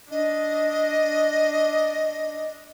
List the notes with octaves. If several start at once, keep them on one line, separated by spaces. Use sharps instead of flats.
D4 D#5